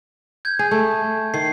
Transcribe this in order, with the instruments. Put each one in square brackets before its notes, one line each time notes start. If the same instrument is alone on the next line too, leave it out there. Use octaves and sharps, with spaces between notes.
[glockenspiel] G6 G#6
[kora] G#4
A3
[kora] D#3 [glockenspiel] C7